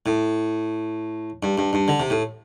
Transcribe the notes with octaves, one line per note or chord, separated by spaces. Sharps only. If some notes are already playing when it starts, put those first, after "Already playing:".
A2
G2
G2
G2
D3
C3
A2